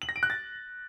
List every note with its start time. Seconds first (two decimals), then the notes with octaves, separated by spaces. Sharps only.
0.02 F#7
0.09 A#6
0.16 D7
0.23 F#6
0.30 A6